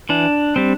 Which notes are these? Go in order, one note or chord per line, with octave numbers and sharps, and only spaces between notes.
E3 D4
G3 C4